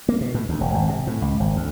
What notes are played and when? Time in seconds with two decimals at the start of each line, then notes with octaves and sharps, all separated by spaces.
0.09 A#3
0.21 B2
0.34 A2
0.49 D2
0.61 E1
0.74 G#1
0.89 C3
1.07 A2
1.22 C#2
1.40 G#1
1.56 D2